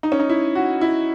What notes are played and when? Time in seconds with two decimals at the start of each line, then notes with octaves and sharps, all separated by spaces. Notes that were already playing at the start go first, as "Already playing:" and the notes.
0.03 D#4
0.12 C#4
0.19 D#4
0.29 E4
0.55 F#4
0.81 E4